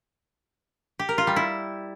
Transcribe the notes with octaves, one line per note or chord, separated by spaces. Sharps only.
G4
A#4
F4
G3
E4